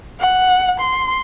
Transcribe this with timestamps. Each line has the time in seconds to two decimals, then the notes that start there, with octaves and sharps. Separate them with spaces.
0.20 F#5
0.80 C6